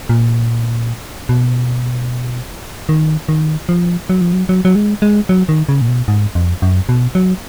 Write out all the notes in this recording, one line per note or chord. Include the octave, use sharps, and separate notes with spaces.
A#2
B2
D#3
D#3
F3
F#3
F3
F#3
F#3
F#3
G#3
G#3
F#3
D#3
C#3
A#2
B2
G#2
F2
F#2
B2
F#3